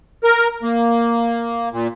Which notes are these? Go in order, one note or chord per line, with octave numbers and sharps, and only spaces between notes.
A#4
A#3
A#2